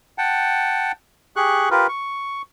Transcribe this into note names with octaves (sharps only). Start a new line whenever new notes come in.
F#5 G5 A5
G4 G#4 C#6 F#6
F4 G4 A#4 B4
C#6